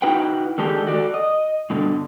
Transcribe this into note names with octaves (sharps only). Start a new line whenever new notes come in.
D#4 E4 F#4 B4 F#5 G5
D3 D#3 G#3 D4 G4 A4
F#4 A4 D5
D#5
G2 B2 D3